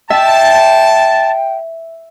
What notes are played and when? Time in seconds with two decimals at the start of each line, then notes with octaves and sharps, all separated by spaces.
0.10 E5 G5 A5